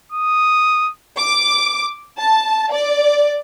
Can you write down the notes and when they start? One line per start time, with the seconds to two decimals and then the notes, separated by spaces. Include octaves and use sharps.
0.12 D#6
1.18 D6
2.18 A5
2.71 D5